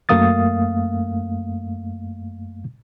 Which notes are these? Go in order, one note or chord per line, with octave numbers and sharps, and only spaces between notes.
F#2 A3 A#3 F5 D#6 A6